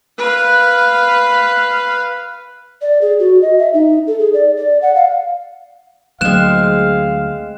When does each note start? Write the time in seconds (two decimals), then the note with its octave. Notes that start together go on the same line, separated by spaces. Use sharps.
0.18 B4 F5
2.82 D5
3.02 G#4
3.20 F#4
3.42 D#5
3.59 E5
3.74 D#4
4.07 A4
4.19 G#4
4.34 D5
4.57 D5
4.82 F#5
4.95 F5
6.21 D2 F#3 G#3 A#3 C4 F5 F#6 E7